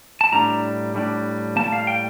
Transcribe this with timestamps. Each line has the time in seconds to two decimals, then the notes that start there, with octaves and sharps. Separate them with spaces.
0.21 A5
0.32 A2 G3 D4 A#5
0.94 A2 G3 D4
1.56 A2 G3 A#3 A5
1.73 F5
1.87 G5